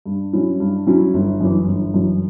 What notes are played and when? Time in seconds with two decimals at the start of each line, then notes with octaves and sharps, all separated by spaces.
0.06 G2
0.33 F#3 C#4 E4
0.60 G2
0.87 F#3 C#4 E4
1.14 G1
1.41 F#2 E3
1.67 G1
1.94 F#2 E3